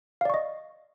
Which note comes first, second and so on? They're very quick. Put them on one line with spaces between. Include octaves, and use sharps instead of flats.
F5 D5 C#6 D#5